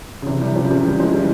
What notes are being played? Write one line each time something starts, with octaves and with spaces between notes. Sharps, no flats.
C#3
C3 E3
E3 G3
C#3 F3
C#3 F3
E3 G3
F3 G#3
E3 G3